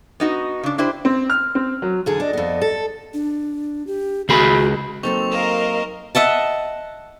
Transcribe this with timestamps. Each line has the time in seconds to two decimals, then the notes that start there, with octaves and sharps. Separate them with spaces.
0.20 B3 D#4 F#4
0.63 C#3 D4
0.78 D4 E4 G4 C5
1.05 C4
1.30 F6
1.55 C4
1.82 F#3
2.06 E2 D3 G#4
2.20 D4 D5 D#5
2.33 F2 B3
2.61 A4
3.14 D4
3.87 G4
4.29 C#2 F#4 G#4 B5
5.03 F#3 A#3 C4 D#4 A4 C5 C#6 F7
5.32 A#4 D#5 F5 C#6 E7
6.15 D#5 E5 F#5 A5